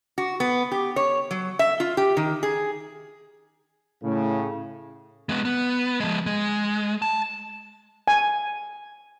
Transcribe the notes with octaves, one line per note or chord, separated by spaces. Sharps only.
F#4
B3
G4
C#5
F#3
E5
F4
G4
D#3
G#4
A2 C#3
G#3 B3
B3
F3 G#3
G#3
A5
G#5